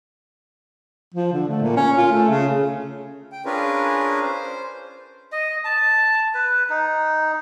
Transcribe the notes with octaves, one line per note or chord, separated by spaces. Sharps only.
F3
D3
A3
A#2
C#4
F4
A3
C#3
G5
C#4 D4 F4 G#4 A#4 B4
C5
D#5
A5
B4
D#4